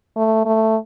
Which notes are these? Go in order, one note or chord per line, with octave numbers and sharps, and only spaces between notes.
A3
A3